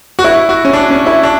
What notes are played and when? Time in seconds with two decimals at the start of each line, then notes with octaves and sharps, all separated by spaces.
0.19 F#4
0.24 E4
0.49 F#4
0.65 C#4
0.73 D4
0.91 C#4
1.06 E4
1.23 D4